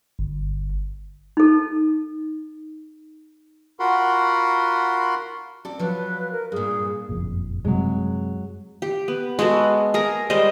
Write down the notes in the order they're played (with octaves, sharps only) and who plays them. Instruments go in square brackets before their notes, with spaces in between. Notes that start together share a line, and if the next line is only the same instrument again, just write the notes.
[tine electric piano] G1
[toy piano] D#4 A4
[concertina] F4 F#4 A#4 F#5 B5 C6
[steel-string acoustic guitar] C4 A4 D5
[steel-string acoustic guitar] F3 F#3 F4 [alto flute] B4
[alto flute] A#4
[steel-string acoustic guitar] G2 A#2 [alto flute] G#4
[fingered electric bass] F#1 F2 A#2
[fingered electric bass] F#2 C3 C4 [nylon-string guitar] F#3 G#3
[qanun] G4
B3
G#3 B3 F#4 A4
G#4 A#4 A#5
G3 G#3 C5 D#5